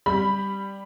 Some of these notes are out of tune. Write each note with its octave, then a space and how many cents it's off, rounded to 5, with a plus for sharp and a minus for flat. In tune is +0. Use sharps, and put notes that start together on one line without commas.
G3 +0 B5 +0